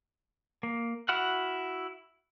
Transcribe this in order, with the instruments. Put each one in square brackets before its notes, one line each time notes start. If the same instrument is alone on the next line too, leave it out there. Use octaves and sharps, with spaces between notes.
[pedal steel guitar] A#3
E4 F#4 F#5 F6 F#6